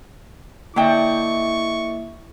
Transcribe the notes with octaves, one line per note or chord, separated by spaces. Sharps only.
D3 A#3 E4 D#5 E5 G5 C#6